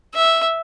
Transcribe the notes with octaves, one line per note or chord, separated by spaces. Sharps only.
E5